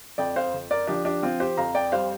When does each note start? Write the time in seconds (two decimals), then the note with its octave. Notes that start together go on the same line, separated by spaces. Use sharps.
0.18 F2 D5 G5
0.36 C5 F5
0.54 F2
0.71 A#4 D5
0.87 F3 D4 G4
1.05 D4 G4
1.23 F3 C4 F4
1.40 G4 C5
1.57 F2 F5 A#5
1.75 D5 G5
1.92 G3 C5 F5